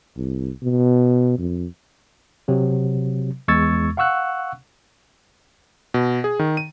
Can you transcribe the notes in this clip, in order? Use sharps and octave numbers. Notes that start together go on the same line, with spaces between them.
C2
B2
F2
C3 F#3
E2 G#3 C#6 E6 G#6 A6
F5 F#5 C#6 E6 F#6
B2
G#4
D#3
D#7